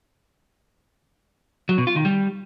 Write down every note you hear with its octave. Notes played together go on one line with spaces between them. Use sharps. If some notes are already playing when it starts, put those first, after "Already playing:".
F#3
B2
F4
D#3
G3